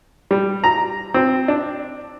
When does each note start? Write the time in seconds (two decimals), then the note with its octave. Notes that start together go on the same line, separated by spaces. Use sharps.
0.31 G3
0.64 A#5
1.14 C4
1.48 D4